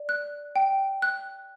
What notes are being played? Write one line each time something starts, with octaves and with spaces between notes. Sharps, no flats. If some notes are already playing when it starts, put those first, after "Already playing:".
Already playing: D5
F#6
G5
F#6